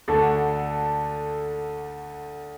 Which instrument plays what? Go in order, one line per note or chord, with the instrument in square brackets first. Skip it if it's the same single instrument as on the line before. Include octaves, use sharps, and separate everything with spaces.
[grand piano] D2 D3 A3 D4 F#4 [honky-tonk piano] A4